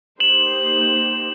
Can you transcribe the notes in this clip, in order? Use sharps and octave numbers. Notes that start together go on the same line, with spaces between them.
A#3 D#4 G4 C5 E7 F#7